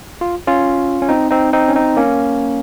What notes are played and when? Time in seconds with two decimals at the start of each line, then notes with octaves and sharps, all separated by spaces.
0.21 F4
0.47 C#4 F4
1.02 C#4
1.09 C4 D#4
1.31 C4 D#4
1.53 C4 D#4
1.68 C#4
1.75 C4 D#4
1.97 A#3 C#4